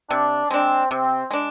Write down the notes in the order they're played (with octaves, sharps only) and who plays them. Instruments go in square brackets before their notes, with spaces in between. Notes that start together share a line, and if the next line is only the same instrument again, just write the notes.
[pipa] C3 [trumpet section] D4
[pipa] G#3 D4 [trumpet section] C4
[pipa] C3 [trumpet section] C4
[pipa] G#3 D4